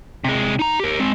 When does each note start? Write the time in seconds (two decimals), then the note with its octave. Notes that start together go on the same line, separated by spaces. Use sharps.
0.24 C3 G#3
0.59 D#4 A#5
0.80 G4 A#4
1.00 G#3 C4